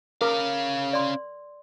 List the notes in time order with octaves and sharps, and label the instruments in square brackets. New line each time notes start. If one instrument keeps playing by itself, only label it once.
[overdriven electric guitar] C#4 F5 [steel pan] A#4 [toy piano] D6
[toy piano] D5 C6